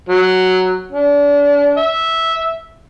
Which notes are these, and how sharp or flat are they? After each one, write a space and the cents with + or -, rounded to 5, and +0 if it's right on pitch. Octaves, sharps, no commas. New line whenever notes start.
F#3 +5
D4 -35
E5 -10